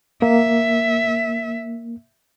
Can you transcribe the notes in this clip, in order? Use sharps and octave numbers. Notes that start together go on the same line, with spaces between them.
A#3 E5